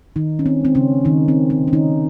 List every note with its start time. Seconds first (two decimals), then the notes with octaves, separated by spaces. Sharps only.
0.16 D#3 D#4
0.39 C#4
0.46 C4
0.60 G#3 C4
0.75 C#3 C#4
1.05 D#3 F3 D#4
1.28 C4
1.50 C3 C4
1.68 C#4
1.73 D#3 D#4